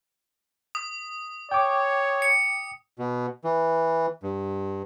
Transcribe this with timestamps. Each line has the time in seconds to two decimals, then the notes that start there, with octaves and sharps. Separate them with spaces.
0.75 D#6
1.51 C#5 G5 D6
2.22 C#7
2.99 B2
3.44 E3
4.23 G2